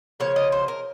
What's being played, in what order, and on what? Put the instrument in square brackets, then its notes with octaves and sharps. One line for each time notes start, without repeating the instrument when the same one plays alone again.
[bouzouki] C#3 F3 A#3 C#5
D#5
C5
A#4